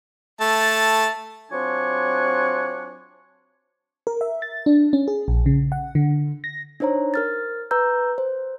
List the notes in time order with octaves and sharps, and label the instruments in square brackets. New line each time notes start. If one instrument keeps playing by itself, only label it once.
[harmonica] A3 A5
[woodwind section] F#3 C4 D4 F4 G#5 C#6
[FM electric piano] A#4
E5
A6
D4
C#4
G#4
A#1
C#3
F#5
D3
A#6
[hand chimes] D4 D#4 C5 C#5 A#5
A#4 F6 A6
B4 A#5 E6 G6
C5